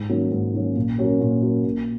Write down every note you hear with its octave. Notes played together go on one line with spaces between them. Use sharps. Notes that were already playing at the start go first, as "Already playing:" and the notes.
Already playing: G#2
D#3 F#3 A#3 C#4
G#2
D#3 F#3 A#3 C#4
A#2
F#3 C#4 F#4 A#4
A#2
F#3 C#4 F#4 A#4
A#2